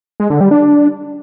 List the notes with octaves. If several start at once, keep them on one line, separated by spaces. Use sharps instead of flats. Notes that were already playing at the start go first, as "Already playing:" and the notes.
G#3
D3
G3
D4